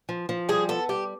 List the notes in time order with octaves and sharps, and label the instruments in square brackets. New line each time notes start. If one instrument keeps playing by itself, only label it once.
[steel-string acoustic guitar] F3
F3
[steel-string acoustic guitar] G3 [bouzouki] G#4
[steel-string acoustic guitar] B3 [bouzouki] A4
[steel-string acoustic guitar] G3 [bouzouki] G4